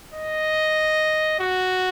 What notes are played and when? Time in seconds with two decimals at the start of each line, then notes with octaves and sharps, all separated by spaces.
0.14 D#5
1.39 F#4